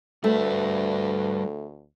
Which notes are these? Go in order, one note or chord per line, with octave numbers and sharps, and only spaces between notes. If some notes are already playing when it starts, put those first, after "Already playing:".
D2 G3 A3 A4 B4